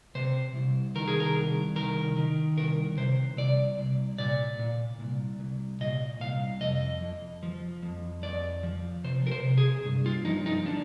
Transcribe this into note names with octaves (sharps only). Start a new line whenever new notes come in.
C3 C5
C2
D#3 A#4
G#4
A#4
C2
D#3 A#4
D#3
C2 A#4
C3 C5
C2 D5
C2
A#2 D5
A#2
C2
C2
A#2 D#5
C2 F5
F2 D#5
F2
F3
F2
F2 D5
F3
C3 C5
A#4
C5
C3
G#4
G2
F4
F3 D#4
D#4
F3 D4